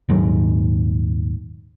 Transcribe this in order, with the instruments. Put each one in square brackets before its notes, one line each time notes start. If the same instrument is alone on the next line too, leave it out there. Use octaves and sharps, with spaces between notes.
[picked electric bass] D#1 D#2 G#2 F#3